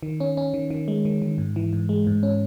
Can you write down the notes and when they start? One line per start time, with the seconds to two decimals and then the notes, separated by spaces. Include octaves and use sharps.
0.03 D#3
0.20 C#4
0.37 C#4
0.54 D#3
0.70 D#3
0.88 G#3
1.05 D#3
1.22 D#3
1.38 G#2
1.56 E3
1.73 G#2
1.89 G#3
2.07 G#2
2.23 C#4